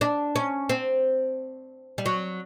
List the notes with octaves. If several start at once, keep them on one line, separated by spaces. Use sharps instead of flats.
D4
C#4
C4
G3
F#3